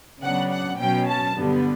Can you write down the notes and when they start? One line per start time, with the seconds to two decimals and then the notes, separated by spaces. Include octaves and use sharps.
0.22 C#3 F#3 B3 D4 F#5
0.51 F#5
0.79 B2 F#3 C#4 G5
1.07 A5
1.35 G2 D3 G3 B3